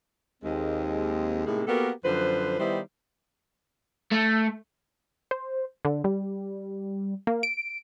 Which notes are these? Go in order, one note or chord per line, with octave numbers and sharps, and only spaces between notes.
D#2 G#3 C4
A2 C3 G#3 A#3 D#4 G#4
A#3 B3 F#4 G4 A4 A#4
F#2 D3 F3 B4 C5
D#3 G3 B3 D#4 E4 C5
A3
C5
D3
G3
A#3
D7